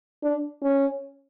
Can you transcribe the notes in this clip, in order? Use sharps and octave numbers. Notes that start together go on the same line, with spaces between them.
D4
C#4